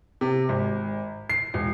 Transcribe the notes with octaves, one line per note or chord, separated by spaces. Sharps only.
C3
G#1
C7
E1